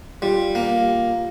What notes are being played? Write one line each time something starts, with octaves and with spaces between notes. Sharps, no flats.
G3 F4 G4
A#3